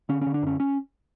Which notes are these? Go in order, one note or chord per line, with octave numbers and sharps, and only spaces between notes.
D3 C#4
C#4
D3
D4
F#2 C#4
C#4